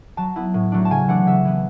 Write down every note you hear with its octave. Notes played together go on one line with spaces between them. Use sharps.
F#3 A5
B3 E4
A2
F#3 A3 D4
A5
C#3 G#5
E3 A3 D4 F#5
C#3 E5
E3 B3